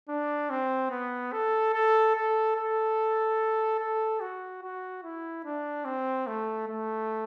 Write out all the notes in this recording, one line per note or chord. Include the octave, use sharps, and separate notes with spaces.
D4
C4
B3
A4
A4
A4
A4
A4
F#4
F#4
E4
D4
C4
A3
A3